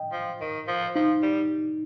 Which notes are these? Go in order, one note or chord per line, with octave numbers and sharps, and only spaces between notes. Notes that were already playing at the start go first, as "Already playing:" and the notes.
Already playing: D#5 G5
F3
D#3
F3
F3 D#4
G3